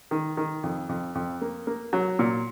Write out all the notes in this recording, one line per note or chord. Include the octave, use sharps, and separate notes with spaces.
D#3
D#3
F2
F2
F2
A#3
A#3
F#3
A#2